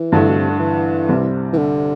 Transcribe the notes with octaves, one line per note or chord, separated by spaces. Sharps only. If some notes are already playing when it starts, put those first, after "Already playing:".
Already playing: E3
G2 D3 A3 E4
B2
C3
D3
E3
C2 C3 G3 C4 E4
E3
D3